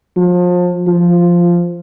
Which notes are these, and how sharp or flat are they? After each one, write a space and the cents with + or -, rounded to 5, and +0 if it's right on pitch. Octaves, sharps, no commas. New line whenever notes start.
F3 +30
F3 -5